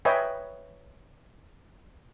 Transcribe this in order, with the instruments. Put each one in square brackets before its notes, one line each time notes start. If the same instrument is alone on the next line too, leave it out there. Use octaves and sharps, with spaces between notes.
[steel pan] B4 C#5 D#5 E5 G5 G#5